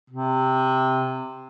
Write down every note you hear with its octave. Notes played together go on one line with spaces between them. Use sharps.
C3